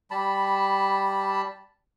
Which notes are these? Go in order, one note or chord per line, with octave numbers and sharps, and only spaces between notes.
G3 A5 B5